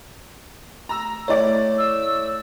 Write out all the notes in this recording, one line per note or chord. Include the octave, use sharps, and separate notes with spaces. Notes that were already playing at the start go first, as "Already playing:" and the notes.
A#5 E6
A3 E4 C#5 D5
E6